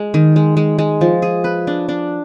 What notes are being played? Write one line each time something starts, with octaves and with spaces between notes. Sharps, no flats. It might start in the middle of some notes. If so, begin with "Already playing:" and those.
Already playing: G#3
D#3
G#3
G#3
G#3
F3
G#4
B4
D4
D4